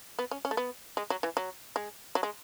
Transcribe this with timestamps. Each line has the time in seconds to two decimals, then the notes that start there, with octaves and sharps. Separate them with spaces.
0.19 B3
0.31 C#4
0.45 C#4
0.51 A3
0.57 B3
0.97 G#3
1.10 F#3
1.23 E3
1.37 F#3
1.76 G#3
2.15 F#3
2.23 G#3